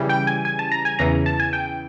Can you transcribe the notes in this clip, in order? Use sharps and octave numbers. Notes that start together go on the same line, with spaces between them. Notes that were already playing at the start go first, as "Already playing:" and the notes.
Already playing: C#3 E3 G3
G5
G#5
G#5
A5
A#5
G#5
E2 C#3 E3 A#5
A5
G#5
G5